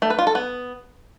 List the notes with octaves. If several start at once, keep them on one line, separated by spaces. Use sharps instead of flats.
A3
B4
F4
A4
B3